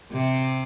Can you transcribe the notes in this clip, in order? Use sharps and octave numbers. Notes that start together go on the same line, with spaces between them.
C3